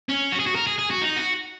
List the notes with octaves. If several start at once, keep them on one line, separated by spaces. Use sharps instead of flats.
C#4
F#4
G#4
F#4
A#4
G#4
G#4
F#4
D#4
F#4